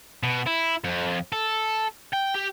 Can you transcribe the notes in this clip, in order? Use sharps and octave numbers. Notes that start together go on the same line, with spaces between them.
B2
E4
F2
A4
G5
G4